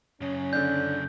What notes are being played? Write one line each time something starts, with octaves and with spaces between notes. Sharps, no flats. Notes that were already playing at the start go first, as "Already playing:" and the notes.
F#2 C#3 C#4
D3 D4 G6